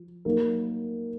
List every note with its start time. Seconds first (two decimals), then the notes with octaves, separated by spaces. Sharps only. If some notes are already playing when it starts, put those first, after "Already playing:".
Already playing: F3
0.25 F#3 A#3 D#4 A#4